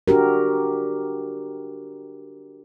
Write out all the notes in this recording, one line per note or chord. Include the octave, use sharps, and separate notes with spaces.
D4 F#4 G4 A#4